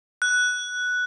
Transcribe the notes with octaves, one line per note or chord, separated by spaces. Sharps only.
F#6